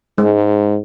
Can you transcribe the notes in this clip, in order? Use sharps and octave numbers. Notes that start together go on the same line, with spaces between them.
G#2 G#3